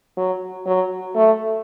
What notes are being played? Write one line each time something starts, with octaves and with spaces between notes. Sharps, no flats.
F#3
F#3
A3